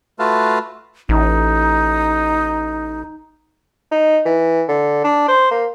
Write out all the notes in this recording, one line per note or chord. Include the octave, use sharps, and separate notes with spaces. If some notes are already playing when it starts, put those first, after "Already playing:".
A3 F4 F#4 B4 F5 A5
A1 D#4
D#4
E3
D3
D4
C5
A#3